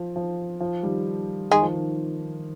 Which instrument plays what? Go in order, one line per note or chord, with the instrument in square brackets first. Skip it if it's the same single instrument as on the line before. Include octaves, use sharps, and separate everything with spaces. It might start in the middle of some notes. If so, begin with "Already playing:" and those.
Already playing: [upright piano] F3
F3
F3
D#3 G3
[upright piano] D#3 [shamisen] G#3 G#4
[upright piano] F3
D#3